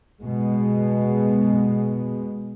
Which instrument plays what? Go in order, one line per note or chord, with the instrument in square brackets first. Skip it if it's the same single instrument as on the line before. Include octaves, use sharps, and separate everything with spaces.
[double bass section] B2 G#3